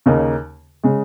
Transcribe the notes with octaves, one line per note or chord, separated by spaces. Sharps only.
D#2 C#3 A#3 D#4
C#3 G#3